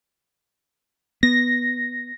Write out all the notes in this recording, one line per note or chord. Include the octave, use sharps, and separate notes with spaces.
B3 A#6